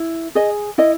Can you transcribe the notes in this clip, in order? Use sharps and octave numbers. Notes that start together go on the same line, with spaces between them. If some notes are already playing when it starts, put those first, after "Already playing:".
Already playing: E4
G#4 D#5
E4 D#5